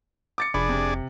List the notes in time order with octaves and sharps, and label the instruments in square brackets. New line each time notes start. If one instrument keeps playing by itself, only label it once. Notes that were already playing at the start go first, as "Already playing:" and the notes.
[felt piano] D6 A6 C#7
[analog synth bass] F1 [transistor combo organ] D4 G#4 D5 [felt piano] B5
[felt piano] C3